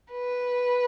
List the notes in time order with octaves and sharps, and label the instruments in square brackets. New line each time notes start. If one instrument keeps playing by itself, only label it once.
[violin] B4